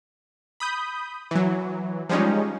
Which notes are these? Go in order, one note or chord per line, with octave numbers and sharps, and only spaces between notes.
B5 D#6 G6
E3 F#3
F3 G3 G#3 C#4 D#4